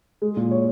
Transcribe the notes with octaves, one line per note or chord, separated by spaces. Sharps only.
G#3
A#2
C#5